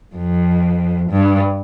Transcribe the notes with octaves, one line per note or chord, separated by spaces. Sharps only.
F2
G2